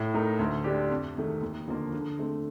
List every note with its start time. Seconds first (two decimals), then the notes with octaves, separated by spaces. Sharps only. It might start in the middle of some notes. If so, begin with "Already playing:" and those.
Already playing: A2
0.14 A3 D#4 A#4
0.39 D2
0.64 D3 A3 D4 G4
0.90 F2
1.16 C3 D#3 A3
1.42 D#2
1.68 D3 F3 A#3
1.93 D3
2.19 A3 C4